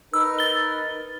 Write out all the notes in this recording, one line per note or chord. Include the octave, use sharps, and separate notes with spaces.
D#4 A#4 B4 E6
A6 G7